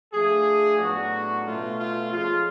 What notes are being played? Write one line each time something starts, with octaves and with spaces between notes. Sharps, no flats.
F3 A3 D4 G#4
A2 F#3 B3 D4 F#4
B2 A3 C#4 F4
F4
F3 G#3 C#4 F4